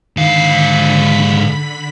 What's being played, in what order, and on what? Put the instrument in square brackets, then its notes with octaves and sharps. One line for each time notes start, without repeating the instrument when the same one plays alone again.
[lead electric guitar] G#2 F5 [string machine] D3 B5 B6 [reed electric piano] D#3